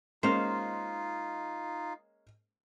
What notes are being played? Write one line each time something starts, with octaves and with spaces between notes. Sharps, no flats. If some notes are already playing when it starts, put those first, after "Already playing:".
G#3 A#3 C#4 D#4 F4 C5 F5